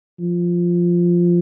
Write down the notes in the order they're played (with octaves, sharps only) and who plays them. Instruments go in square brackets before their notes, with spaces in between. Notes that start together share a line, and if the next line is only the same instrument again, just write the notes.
[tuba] F3